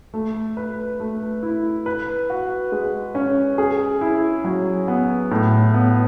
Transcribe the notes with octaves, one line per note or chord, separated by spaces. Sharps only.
A3
B4
A3
E4
B4
F#4
G#3
C#4
G#4
E4
F#3
B3
A2
B3